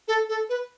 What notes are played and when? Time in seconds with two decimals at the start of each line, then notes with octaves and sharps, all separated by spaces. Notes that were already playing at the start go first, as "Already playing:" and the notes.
0.08 A4
0.29 A4
0.49 B4